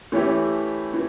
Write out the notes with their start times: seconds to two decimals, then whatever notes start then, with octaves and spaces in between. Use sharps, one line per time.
0.12 E3 A3 C#4 E4 G4
0.93 E3